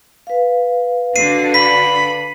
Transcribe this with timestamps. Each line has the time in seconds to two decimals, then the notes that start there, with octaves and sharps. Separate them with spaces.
0.27 B4 F5
1.16 D3 D4 F#4 C7 D#7
1.54 B5 B6